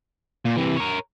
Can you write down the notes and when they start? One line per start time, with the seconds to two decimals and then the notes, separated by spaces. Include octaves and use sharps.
0.45 A#2
0.56 C3 E3
0.76 A#4 C#5